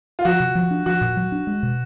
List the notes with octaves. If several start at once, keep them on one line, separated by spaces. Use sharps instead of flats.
F4
F3 F#4
C3
F3
D4
F3 F#4
A#2
F#3
D4
G#3
B2